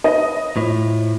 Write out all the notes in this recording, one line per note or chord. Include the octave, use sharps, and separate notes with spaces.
B4 C#5 D#5
A2 F4 C5